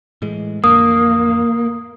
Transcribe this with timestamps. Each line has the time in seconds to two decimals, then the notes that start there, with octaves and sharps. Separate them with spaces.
0.22 A2 E3 G#3
0.64 A1 F2 D3 A#3 D#6